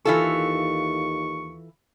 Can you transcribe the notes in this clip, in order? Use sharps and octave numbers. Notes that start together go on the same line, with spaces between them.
D#2 E3 F4 A4 C#6